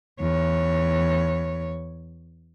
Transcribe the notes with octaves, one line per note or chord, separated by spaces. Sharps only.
E2 C#5